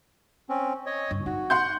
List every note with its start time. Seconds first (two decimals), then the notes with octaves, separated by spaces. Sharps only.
0.49 C4 C#4
0.86 C#5 D#5
1.11 F#1 G2
1.26 D#4 F#4
1.50 F#5 C6 G6